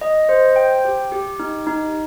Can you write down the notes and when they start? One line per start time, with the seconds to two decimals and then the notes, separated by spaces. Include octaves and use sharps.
0.01 D#5
0.29 C5
0.56 G5
0.85 G4
1.12 G4
1.39 D#4
1.67 D#4